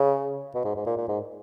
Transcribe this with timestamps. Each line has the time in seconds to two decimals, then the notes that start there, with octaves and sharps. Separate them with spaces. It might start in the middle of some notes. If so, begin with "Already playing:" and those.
Already playing: C#3
0.54 B2
0.65 G#2
0.76 G#2
0.86 A#2
0.97 A#2
1.08 G#2